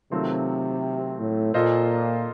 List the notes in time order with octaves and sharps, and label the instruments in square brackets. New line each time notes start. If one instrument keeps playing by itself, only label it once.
[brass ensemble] C3 [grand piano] D#3 F#3 A3 C4 F4
[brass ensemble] A2
[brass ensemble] A#2 [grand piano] A#3 F4 A4 C5 D#5